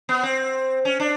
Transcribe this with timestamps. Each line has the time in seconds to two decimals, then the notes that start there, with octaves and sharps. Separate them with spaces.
0.09 B3
0.23 C4
0.85 C#4
1.00 D4